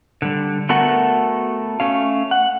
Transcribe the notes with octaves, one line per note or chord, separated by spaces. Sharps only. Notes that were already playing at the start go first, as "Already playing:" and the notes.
D3 G3
A3 B3 F#4 A4 A#4 F#5
A3 C#4 F5
F#5